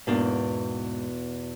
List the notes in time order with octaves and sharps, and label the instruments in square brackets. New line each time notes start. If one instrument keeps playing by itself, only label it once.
[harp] E2 B2 [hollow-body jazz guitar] G#2 A#3 D4